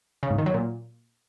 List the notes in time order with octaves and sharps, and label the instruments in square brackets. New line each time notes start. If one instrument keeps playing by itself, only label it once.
[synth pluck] C#3
G#2
D#3
F#3
A#2